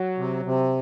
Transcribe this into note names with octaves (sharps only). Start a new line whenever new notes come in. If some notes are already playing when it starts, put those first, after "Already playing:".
Already playing: F#3
C3
C3